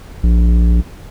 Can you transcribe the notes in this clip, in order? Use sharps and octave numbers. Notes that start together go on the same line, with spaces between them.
A#1